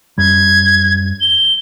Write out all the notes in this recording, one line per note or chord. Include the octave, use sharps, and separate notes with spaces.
F#2 G3 G#6
G7